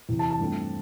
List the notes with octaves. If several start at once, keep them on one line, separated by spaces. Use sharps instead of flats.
E2 C3 E3
A5
A5
G2 F3 A3 C4